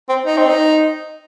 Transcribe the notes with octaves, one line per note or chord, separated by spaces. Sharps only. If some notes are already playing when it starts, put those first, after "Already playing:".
C4
D#4
C4
D#4